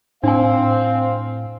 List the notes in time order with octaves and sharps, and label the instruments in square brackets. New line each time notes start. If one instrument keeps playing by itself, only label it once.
[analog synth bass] A2 [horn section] C4 [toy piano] D4 G#5 [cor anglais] F5